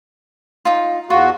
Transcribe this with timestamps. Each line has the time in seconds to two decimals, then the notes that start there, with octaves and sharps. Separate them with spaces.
0.65 D#4 F4
1.10 E2 F4 F#4